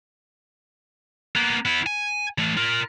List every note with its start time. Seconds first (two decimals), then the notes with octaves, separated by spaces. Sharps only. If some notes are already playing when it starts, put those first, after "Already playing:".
1.35 A#3 B3
1.65 B3 E4
1.86 G#5
2.38 E3 A3
2.57 F4 A#4